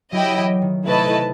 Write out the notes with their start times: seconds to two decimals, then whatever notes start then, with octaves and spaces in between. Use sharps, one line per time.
0.12 F#3 E4 G4 D#5 G5
0.37 E3
0.62 D#3
0.87 C3 A3 E4 B4 D#5 A5
1.05 D#3